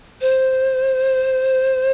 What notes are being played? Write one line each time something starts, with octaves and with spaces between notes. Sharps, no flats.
C5